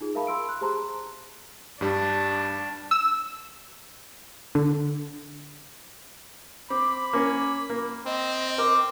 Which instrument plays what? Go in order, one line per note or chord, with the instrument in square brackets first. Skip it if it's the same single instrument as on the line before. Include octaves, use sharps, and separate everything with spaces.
[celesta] D#4 F4 G#4
A#4 E5 F5 A5 B5
B5 C6 E6 D7
F#6
G4 G#4 C5 A5 A#5 C6
[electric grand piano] G2 G3 [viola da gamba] D4
[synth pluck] E6
D3
[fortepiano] C4 [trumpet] B5 [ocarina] D6
[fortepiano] A#3 C#4 [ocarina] D6
[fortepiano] A#3
[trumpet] C4 [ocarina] D#5
[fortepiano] A#4 [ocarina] D6